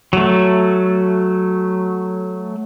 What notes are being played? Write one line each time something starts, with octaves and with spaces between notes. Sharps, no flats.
F#3 A3